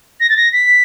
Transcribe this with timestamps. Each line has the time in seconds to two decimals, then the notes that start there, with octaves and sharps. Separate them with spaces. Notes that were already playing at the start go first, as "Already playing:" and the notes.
0.20 A#6
0.30 A6
0.37 A#6
0.53 B6